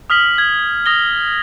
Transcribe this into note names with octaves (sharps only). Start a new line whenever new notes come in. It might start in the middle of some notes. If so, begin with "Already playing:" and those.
D#6 F6 B6 F#7
G#6
D#6 A#6 G7